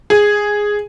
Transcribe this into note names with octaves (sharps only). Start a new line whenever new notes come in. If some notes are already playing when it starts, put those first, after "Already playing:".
G#4